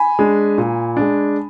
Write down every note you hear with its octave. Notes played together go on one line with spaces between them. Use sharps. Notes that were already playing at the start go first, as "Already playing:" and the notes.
Already playing: G#5 B5
G#3 D4
A#2
G#3 D4